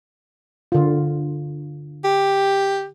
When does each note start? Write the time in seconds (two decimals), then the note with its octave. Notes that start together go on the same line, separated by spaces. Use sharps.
0.72 D3 F4
2.04 G4